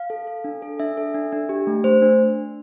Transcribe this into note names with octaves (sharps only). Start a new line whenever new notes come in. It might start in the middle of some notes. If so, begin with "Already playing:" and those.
Already playing: F5
A4
A4
D4
A4
D4 E5
A4
D4
D4
G4
A3
A3 C5
D4